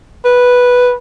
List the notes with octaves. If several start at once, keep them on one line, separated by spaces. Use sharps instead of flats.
B4